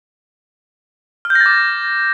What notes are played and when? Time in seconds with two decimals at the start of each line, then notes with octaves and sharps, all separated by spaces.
1.25 F6
1.30 G6
1.35 A#6
1.41 A6
1.46 D6